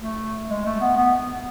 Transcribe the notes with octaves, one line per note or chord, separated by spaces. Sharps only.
A3
G#3
A3
B3
B3